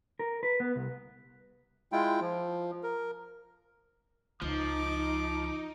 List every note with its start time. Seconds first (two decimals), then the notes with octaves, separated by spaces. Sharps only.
0.19 A#4
0.43 B4
0.60 B3
0.76 C2
1.92 G#3 E4 F4 G5
2.21 F3
2.83 A#4
4.41 C#2 F3 D#4 D6